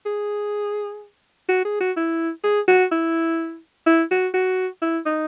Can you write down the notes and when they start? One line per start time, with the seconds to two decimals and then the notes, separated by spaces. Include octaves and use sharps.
0.06 G#4
1.49 F#4
1.65 G#4
1.80 F#4
1.97 E4
2.44 G#4
2.68 F#4
2.92 E4
3.87 E4
4.11 F#4
4.34 F#4
4.82 E4
5.06 D#4